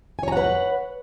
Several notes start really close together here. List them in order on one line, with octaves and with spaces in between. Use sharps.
G#5 C#5 A#5 F#5 B4